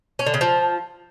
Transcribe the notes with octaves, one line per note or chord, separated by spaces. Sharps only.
C#4
D3
C#3
F3